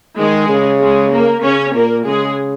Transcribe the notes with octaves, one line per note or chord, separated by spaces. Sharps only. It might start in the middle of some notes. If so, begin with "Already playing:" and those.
D#3 G#3 G#4
C#3
G#3 G#4
A#3 A#4
C#3 C#4 C#5
A#2 A#3 A#4
C#3 G#3 G#4